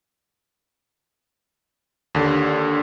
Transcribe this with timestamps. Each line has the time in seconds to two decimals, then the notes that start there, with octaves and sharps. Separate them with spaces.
2.15 D#2 D3